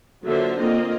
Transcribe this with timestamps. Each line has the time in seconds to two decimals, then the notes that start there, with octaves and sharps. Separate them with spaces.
0.24 D3 F#3 A#3 F4 C5 E5
0.58 A#3 C4 F4 D#5